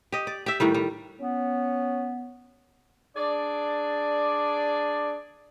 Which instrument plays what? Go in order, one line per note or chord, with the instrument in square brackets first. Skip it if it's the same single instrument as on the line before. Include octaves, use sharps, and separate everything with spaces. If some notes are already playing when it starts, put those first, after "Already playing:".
[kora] G4 D#5
D5
G4 E5
A2 D#3 G3
G3
[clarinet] B3 [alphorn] C#4
[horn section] D4 G#4 D5